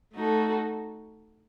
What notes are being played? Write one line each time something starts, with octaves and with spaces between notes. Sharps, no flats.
A3 D#4 F#4 A4